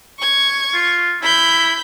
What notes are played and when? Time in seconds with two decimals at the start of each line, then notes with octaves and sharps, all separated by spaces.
0.19 C#6 G#6
0.74 F4
1.22 E4 B5 G6